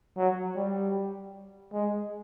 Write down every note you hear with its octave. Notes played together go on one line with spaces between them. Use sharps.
F#3
G3
G#3